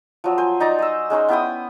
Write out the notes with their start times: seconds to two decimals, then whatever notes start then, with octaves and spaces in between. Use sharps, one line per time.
0.24 F3 F#3
0.38 C5 G#5
0.60 D#4 D5 A#5
0.79 D#5 E6
1.10 G#3 C#4 D#4 C5
1.28 B3 E4 G5 D#6